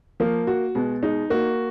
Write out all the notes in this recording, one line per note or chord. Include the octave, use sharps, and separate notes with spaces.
F3 A#3
F#4
B2 G#3
G#3 D#4
A#3 F#4